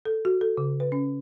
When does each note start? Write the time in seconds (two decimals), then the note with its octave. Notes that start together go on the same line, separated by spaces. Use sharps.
0.05 A4
0.25 F#4
0.41 A4
0.57 C#3
0.80 B4
0.92 C#4